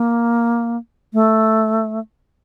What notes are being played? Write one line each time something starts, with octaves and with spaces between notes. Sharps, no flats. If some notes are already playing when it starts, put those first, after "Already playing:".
Already playing: A#3
A3